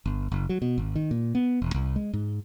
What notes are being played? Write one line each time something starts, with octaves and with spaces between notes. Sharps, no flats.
G1
F#1
F#3
B2
G#1
D#3
A#2
B3
E1
C2
G#3
G#2